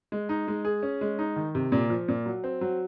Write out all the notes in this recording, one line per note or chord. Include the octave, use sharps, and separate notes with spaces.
G#3
D#4
G#3
G#4
C#4
G#3
D#4
D#3
C3
A#2
F3
A#2
F#3
C4
F#3